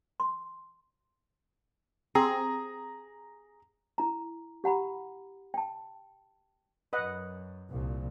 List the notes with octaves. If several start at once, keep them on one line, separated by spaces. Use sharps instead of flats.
C6
C4 G#4 A#5
E4 A#5
G4 F#5 A#5 B5
G5 A5
F#2 B4 D#5 F#5
C2 A#2 F3